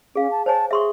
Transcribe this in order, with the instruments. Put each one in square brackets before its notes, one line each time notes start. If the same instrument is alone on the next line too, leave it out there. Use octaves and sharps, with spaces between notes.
[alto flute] C#4 [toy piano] G#4 F5
[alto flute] A5
[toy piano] C5 C#5 G#5 [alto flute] A5
[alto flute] G#4 [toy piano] E5 C6 C#6